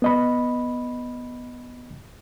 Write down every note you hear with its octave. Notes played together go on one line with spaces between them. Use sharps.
B3 D#5 B5